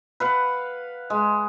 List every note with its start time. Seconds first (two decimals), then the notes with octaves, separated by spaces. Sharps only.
0.20 B4 F5 F#5
1.10 G#3